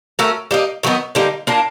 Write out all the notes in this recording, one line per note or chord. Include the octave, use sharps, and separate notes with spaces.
A3 C#4 F#4 A#4
G3 A#3 D#4
D#3 F#3 B3 D#4
D3 G3 A#3 D#4
A#3 D4 F4 A#4